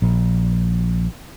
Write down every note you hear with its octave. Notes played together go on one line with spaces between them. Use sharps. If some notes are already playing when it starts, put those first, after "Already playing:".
A#1